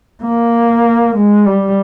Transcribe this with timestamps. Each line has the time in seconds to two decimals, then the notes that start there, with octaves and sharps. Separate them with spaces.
0.23 A#3
1.16 G#3
1.46 G3